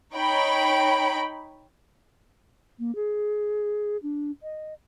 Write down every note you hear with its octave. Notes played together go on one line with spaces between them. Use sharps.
D#4 C#5 G5 B5 D7
A#3
G#4
D4
D#5